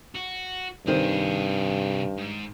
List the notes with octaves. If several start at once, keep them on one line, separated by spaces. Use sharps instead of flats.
F#4
G2 C3 D#3 C4 G#4
G#2